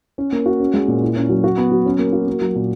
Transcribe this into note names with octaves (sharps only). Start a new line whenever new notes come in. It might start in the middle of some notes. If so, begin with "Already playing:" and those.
C#4
A#3
F#4
C#4
G#3
A#2
E4
C#4
F#3
F#4
B3
F#3
C#4
A#3
F#4
A#3
F#3
A#2